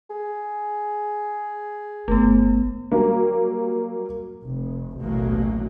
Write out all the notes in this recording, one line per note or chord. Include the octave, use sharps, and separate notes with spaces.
G#4
G1 A3 B3
F#3 G3 A#3
F1
A1 D2 B2 F#3 A#3